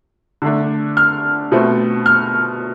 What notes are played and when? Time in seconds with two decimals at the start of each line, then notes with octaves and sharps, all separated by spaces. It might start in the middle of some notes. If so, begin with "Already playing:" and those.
0.42 D3 A3 D4
0.97 F6
1.52 B2 A3 C4
2.06 F6